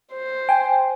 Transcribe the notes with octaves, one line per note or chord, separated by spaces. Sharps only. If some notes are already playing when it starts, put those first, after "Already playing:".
C5
G5 G#5